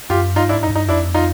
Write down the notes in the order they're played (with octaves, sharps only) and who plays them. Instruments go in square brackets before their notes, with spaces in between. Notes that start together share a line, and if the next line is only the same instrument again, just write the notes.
[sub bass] F#2 [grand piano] F4 G4
[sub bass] G2 [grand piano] D#4 F4
[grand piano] D4 E4
[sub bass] G#2
[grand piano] D#4
[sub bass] F#2
G2
[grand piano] D#4
[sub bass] F2 [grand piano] D4 E4
[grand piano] D#4 F4